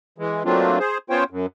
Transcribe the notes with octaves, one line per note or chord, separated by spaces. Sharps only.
E3 G#3
F#3 A3 A#3 C4 D4 F4
G#4 C5
B3 C#4 F4 C5 C#5 G5
F#2